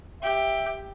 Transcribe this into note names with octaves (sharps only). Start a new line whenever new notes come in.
G4 E5